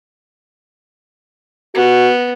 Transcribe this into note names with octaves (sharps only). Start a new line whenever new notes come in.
B3 F#4